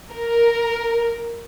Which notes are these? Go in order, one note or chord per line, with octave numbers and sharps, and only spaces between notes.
A#4